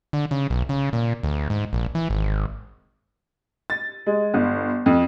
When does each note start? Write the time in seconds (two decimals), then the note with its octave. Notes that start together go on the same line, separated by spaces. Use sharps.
0.13 D3
0.31 C#3
0.50 B1
0.69 C#3
0.93 A#2
1.23 D2
1.50 G#2
1.73 A#1
1.95 E3
2.10 G#1
3.70 A6
4.06 G#3
4.34 G1
4.86 F2